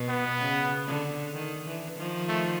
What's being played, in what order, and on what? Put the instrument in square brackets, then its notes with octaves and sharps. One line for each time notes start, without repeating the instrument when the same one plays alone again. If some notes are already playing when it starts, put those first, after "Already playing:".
Already playing: [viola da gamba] B2
[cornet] B3
[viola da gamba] C#3
D3
D#3
D3 E3
D#3 F3
[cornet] A3